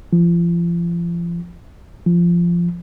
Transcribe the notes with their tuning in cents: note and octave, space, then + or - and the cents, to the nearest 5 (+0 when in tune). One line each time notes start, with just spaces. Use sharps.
F3 -35
F3 -15